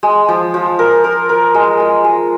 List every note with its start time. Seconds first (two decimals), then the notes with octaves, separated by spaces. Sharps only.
0.03 G#3
0.28 F3
0.54 F3
0.79 A#4
1.04 A#4
1.29 A#4
1.54 G#3
1.80 G#3
2.04 G#3